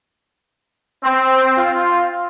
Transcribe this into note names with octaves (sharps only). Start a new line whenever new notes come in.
C4
F4